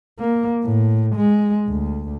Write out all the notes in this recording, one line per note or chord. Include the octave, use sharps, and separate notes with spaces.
A#3
A2
G#3
D2